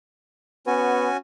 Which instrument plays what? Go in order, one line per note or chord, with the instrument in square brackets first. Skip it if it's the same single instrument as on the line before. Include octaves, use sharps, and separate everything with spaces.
[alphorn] B3 [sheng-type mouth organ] C#4 F#4 G#5